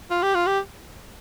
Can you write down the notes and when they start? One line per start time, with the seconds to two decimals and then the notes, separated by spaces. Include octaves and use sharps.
0.11 F4
0.22 G4
0.35 F4
0.46 G4